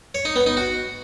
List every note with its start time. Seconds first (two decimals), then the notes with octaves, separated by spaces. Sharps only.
0.15 C#5
0.25 D#4
0.36 B3
0.46 D#4
0.57 F#4